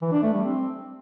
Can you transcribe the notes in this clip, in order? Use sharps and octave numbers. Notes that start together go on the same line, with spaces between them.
E3
D4
A3
G3
C4